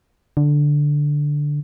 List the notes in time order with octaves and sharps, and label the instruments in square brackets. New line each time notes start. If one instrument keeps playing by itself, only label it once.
[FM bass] D3